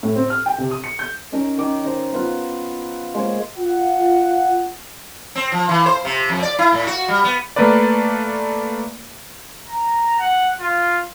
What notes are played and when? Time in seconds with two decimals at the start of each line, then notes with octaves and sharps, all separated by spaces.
0.03 A2
0.16 C4
0.30 F6
0.46 G5
0.58 C3
0.71 D#6
0.84 C#7
0.99 G6
1.32 C#4 D#4 A#4
1.58 D#3 D6
1.84 D#3 C5 A#5
2.13 B3 F4 B4 F5
3.14 G#3 A#3 C5 C#5
3.57 F4 F#5
5.35 C4
5.52 F3
5.69 E3
5.86 C5
6.05 C3
6.29 F2
6.42 D5
6.59 E4
6.72 A2
6.87 F#4
7.08 G3
7.24 B3
7.56 A3 A#3 A#4 B4 D5
9.68 A#5
10.19 F#5
10.60 F4